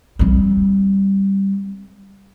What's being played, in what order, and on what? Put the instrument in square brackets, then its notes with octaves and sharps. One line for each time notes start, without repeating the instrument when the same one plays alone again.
[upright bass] G3 C4